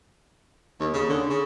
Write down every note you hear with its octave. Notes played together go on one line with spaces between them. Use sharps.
D#2
C#3
D3
C#3